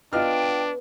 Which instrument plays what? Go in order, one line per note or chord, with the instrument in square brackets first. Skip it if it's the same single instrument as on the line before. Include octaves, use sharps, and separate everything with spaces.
[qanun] B3 [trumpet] D4 [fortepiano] F4 D#5 F6 [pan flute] G5